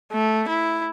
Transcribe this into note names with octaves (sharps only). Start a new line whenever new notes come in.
A3
E4